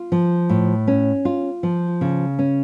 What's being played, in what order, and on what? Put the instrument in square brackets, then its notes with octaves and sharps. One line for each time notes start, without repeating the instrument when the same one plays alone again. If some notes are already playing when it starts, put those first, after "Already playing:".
Already playing: [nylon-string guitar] F4
F3
A2
C#4
F4
F3
C#3
C#4